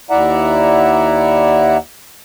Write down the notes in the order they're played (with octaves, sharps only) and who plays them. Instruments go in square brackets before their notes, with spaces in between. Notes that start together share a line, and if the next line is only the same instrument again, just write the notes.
[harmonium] D#2 E4 D5 E5 F#5 A#5